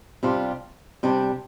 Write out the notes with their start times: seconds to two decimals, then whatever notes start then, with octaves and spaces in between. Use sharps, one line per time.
0.23 C3 G3 D4 F4
1.03 C3 G3 D4